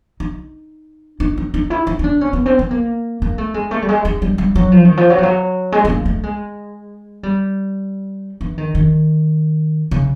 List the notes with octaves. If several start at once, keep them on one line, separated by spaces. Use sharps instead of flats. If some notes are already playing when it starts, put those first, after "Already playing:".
D#4
D#4
D#4
D#4
E4
D#4
D#4
D4
C#4
B3
C4
B3
A#3
A#3
A3
G#3
A3
G3
G#3
G#3
G3
G3
F#3
F3
D#3
F3
F#3
F3
F#3
G#3
A3
A#3
A3
G#3
G3
E3
D#3
D#3
C#3